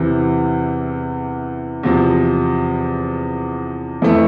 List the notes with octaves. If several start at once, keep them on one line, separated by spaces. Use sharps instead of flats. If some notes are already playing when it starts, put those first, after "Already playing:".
Already playing: E2 C3 E3
E2 C3 F3
F2 E3 A3